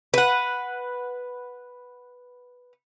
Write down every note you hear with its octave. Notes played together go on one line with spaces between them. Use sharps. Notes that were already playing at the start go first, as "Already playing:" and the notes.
B4 F#5